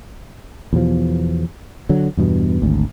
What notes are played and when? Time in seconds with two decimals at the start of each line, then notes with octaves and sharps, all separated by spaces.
0.73 E2 B2 F3
1.89 D3 F#3
2.17 E2 G2 B2
2.62 G#1 D2